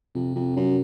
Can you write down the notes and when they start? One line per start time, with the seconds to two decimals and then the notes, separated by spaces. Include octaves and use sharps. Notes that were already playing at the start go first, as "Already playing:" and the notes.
0.15 F2 C3
0.35 F2
0.56 F#2